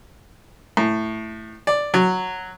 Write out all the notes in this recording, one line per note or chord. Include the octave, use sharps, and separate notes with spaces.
A2
D5
F#3